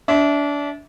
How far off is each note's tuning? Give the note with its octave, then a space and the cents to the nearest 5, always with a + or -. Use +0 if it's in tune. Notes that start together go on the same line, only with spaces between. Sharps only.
D4 -30 E5 -20